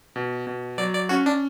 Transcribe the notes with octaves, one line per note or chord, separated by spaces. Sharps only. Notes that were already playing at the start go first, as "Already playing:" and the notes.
B2
B2
F#3 D5
D5
C#4 F#4
D4